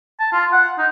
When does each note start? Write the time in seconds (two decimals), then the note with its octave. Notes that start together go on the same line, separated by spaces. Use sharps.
0.20 A5
0.33 F4
0.53 F#5
0.78 D#4